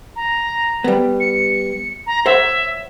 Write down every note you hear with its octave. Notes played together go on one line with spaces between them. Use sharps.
A#5
G3 B3
C#7
A#5
C5 C#5 E5 F#5